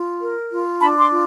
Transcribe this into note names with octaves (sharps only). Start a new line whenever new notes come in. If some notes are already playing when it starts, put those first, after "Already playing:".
Already playing: F4
A#4
F4
D4 A5 B5
C6 D6
F4